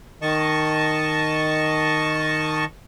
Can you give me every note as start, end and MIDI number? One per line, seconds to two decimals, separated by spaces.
0.22 2.65 51
0.22 2.65 75
0.22 2.65 81
0.22 2.65 85